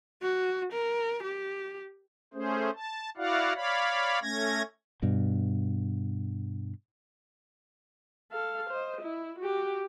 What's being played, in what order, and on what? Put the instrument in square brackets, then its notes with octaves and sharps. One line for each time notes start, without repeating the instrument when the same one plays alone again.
[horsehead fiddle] F#4
A#4
G4
[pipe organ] A3 C#4 G#4 C5
A5
E4 F#4 D5 F5 F#5
C#5 D5 F5 B5
A3 C#4 G#6 A#6
[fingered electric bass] G2 B2
[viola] A4 F5
C5 D#5
E4
F#4 G4